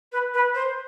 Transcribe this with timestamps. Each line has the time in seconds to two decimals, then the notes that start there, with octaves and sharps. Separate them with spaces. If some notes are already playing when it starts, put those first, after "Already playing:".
0.12 B4
0.34 B4
0.55 C5